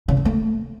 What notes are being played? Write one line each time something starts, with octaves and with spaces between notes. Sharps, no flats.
C#3
D3
A3